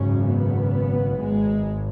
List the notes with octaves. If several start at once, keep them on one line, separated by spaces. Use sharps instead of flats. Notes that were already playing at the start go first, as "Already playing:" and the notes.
Already playing: G#1 F#2 C#3 C#4
B3
G#1 G#3